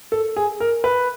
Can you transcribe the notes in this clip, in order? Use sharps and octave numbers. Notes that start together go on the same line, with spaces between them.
A4
G#4
A#4
B4